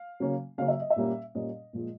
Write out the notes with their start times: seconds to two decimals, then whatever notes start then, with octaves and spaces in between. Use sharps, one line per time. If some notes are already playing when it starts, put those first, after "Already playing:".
Already playing: F5
0.20 C#3 F#3 A#3 C#4
0.58 C#3 F#3 A#3 C#4 F5
0.68 E5
0.80 D#5
0.90 E5
0.96 A#2 G3 A#3 C#4
1.35 A#2 G3 A#3 C#4 D#5
1.73 A#2 F3 G#3